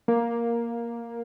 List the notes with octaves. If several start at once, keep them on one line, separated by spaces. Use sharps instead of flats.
A#3